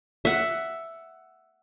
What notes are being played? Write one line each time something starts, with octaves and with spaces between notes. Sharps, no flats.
E5 F#5